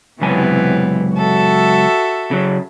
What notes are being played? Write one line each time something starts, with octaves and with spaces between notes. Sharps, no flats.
C#2 F#2 C3 E3 B3 G#5
F#4 A4 E5
C#3 F#3